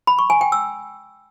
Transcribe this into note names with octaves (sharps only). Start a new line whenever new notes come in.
B5
C#6
G#5
G5
E6